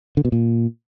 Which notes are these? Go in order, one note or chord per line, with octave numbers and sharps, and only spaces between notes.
D3
B2
A#2